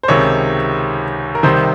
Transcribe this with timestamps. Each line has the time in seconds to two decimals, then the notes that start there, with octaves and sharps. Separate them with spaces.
0.03 C5
0.08 C#2 C3 D#3 C#5
1.35 A#4
1.43 C2 C3 D#3 C5